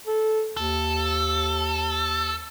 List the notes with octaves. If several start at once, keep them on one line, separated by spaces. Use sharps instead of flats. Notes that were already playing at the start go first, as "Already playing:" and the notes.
A4
D#2 A4